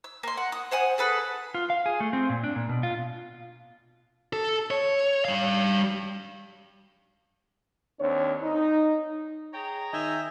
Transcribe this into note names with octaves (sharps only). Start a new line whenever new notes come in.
E6
A#3 C6
F#5
D#6
C5 F#5 G#5 D#6
G#4 A4 B4
F4
F5
G#4
A3
C4
A#2
D4
A#2
B2
F4
A4
C#5
G3 F5
D#2 C4 D4 C#5
D#4
G#4 C#5 G5 A#5
D#3 D#5 E5 G5 G#5